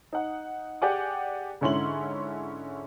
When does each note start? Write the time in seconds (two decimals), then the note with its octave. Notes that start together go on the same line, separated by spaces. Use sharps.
0.13 D#4 F#5
0.82 G4 G#4 D5 F#5 G#5 D6
1.61 G#2 D3 C#4 E4 C6 F#7